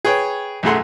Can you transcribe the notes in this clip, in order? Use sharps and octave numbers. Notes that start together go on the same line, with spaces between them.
G#4 B4 C#5 G5
B1 F#2 A3 G#4 F#5 C6